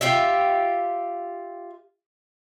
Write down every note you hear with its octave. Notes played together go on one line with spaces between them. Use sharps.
F4 G4 E5